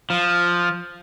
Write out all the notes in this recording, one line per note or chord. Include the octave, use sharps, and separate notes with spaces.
F3